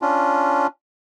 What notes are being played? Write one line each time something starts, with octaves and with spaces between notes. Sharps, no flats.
C#4 D4 F4